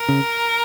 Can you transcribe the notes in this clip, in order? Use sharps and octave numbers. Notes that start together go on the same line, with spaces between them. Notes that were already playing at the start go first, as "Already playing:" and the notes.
Already playing: A#4
C#3